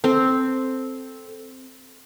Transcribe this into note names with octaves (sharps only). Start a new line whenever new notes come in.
C4 A4